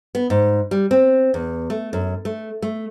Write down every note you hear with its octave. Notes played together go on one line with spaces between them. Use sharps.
B3
G#2
G3
C4
E2
A3
F#2
A3
A3